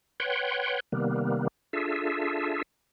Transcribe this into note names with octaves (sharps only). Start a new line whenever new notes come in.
B4 C#5 F#5 G5 C6
C3 D#3 G3 A#3 B3
D4 F4 G#4 A4 E5